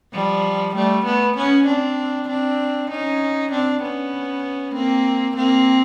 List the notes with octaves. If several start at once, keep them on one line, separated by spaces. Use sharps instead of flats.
F3 G3
G3 A3
A3 B3
B3 C#4
C4 D4
C4 D4
C#4 D#4
C4 D4
B3 C#4
A#3 C4
A#3 C4